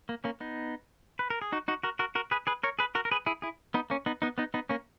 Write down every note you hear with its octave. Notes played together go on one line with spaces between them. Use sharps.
A#3
A#3 C#4
B3 D#4
B4
A#4
G#4
D#4 F#4
D#4 F#4
F#4 A#4
F#4 A#4
F#4 A#4
G#4 B4
G#4 B4
A#4 C#5
G#4 B4
F#4 A#4
A#4
G#4 B4
E4 G#4
E4 G#4
B3 D#4
A#3 C#4
B3 D#4
B3 D#4
B3 D#4
B3 D#4
A#3 C#4